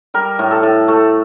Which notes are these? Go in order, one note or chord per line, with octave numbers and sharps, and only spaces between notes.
G3 A#4
A2
A4
A2
A3 A4